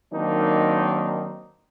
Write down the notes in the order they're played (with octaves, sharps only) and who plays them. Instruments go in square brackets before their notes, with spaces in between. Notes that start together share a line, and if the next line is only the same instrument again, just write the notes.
[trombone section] D#3 F#3 A#3 C4 D4 D#4